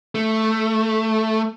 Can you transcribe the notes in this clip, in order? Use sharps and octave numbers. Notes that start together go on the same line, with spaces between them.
A3